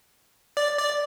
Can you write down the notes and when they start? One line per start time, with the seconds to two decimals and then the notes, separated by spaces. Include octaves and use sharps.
0.57 D5
0.78 D5